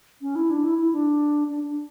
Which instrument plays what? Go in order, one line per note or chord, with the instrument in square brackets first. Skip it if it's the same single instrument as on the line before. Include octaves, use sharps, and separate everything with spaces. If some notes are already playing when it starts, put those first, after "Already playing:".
[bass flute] C#4
E4
D4
E4
E4
D4
D4
D4